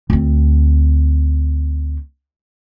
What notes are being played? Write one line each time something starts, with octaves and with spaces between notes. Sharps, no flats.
D2 C4